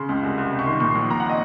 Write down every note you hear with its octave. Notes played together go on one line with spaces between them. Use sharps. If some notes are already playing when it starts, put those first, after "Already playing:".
Already playing: C#3 C6
C#2
C2
C2
C3
C#6
D#3 C6
A#2 C#6
C6
A#1
A#2 A#5
F#5
D#5